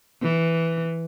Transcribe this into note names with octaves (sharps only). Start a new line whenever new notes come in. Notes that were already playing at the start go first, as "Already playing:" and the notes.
E3